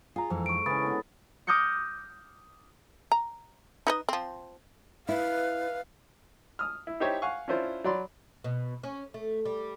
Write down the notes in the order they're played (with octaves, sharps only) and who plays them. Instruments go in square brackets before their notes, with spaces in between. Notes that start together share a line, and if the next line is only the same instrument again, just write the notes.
[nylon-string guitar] F4 [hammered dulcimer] G#4 A#5
[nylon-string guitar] F2 E3 [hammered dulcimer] G#2 A4
[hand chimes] C#6 D7
[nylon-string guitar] C#3 [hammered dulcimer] E3 C#4 [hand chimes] B5 D#6 A6
[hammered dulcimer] D3 B3
[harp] D6 D#6 F6 G6 A#6 C#7
[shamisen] A#5
D#4 B4 D#5
F3 C4
[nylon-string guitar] E4 [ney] B4 [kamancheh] F5
[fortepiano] D#6 F6
E4
D#4 E4 G4 C5 C#5 E5
F5 F#5 G#5 C#6
C#4 D4 E4 F4 C5
F#3 D5 B5 C6
[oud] B2
C#4
A3
G3